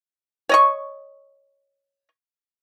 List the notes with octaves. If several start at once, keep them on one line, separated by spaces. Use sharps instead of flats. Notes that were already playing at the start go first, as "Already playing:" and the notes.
C#5 D#5 C#6